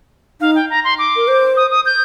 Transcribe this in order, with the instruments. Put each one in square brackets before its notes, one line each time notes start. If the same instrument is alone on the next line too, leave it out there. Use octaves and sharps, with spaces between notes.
[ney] D#4 [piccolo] F5
[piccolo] G5
A#5
C6
D6
[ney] A#4
C5
[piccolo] D#6
D#6
G6